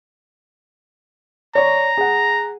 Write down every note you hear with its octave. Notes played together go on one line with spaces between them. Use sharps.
C#5 D5 A#5 C#6
G#4 F#5